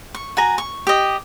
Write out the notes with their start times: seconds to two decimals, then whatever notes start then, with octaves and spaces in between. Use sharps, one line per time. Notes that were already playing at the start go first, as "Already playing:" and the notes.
0.15 C#6
0.37 F#4 G#5 A#5
0.58 C#6
0.87 G4 D#5